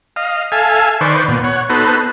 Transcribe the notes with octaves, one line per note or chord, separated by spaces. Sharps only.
D#5 F5
A4 E5 F5 G#5
D#3 B4 C5 D5 C#6
A#2 B3
C#5 F#5
B3 D#4 F#4 A4 B4 C5